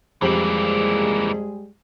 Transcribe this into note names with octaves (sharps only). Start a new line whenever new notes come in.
F2 E3 G3 G#3 A#3 G4 G#4 F#7